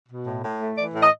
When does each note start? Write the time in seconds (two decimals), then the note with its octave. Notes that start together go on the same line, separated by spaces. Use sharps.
0.09 B2
0.27 A2
0.44 A2
0.60 A3
0.77 E3 D5
0.95 A2
1.03 D#5